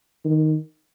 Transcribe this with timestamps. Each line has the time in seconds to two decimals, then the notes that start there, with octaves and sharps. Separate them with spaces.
0.25 D#3